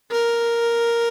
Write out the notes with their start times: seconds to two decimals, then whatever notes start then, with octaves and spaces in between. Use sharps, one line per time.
0.11 A#4